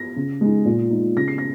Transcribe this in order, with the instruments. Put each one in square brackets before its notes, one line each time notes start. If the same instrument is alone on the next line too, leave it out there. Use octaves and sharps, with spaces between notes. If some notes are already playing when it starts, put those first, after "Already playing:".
Already playing: [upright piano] A#6
C#3
G#3 D#4
A#2
G#3 D#4
C#3 A#6
C7
A#6